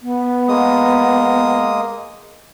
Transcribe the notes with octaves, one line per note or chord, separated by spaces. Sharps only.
B3
G#3 A#3 D#6